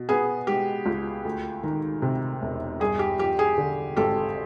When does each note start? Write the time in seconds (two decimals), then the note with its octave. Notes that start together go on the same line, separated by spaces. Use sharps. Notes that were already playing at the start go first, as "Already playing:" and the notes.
Already playing: B2
0.09 B3 G#4
0.47 G#3 G4
0.86 C#2
1.25 D2
1.63 D#3
2.02 C3
2.42 E1
2.80 G2 G#4
2.99 G4
3.19 F3 G4
3.39 G#4
3.58 D3
3.97 G#1 G4 A4